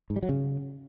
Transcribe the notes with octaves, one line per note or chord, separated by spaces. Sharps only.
G#2
G3
F#3
C#3